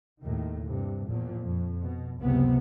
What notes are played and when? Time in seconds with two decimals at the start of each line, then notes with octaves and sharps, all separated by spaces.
0.22 D#2 A2 D#3
0.65 G2 C3
1.07 E2 A#2 F3
1.38 F2
1.83 B2
2.19 F#1 C#2 C3 B3